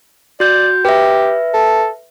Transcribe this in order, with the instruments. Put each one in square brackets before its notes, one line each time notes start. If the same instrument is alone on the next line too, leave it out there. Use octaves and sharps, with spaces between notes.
[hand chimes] F#4 G6 [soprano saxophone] D5
[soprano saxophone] G4 [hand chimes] B4 E5
[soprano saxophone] A4